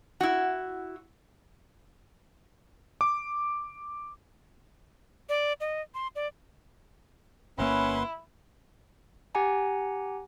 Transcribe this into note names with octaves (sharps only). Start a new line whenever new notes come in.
E4 F#4
D6
D5
D#5
C6
D5
G1 A#3 C#4 E4 B4 F#5 C6
G4 F#5 G#5 A#5